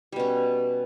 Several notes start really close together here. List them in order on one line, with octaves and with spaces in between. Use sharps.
G3 B2 C#4